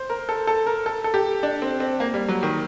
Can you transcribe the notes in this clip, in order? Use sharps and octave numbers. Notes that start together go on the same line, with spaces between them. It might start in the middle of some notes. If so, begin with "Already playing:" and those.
Already playing: C5
A#4
A4
A4
A#4
A4
A4
G4
D4
C4
C4
A#3
G3
F#3
D#3